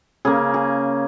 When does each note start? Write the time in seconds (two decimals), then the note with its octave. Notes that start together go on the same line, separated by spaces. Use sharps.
0.25 C#3 A#3 G#4
0.54 G#4